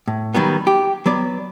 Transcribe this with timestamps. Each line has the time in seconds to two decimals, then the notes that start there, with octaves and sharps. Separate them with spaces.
0.08 A2
0.34 D#3 F#3 G3 B3
0.67 G4
1.06 F#3 B3 D5